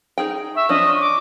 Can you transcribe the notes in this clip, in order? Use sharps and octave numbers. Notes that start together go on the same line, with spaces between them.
D#4 G#4 G5
E5 C#6
F3 C#4 D4 D#5
D6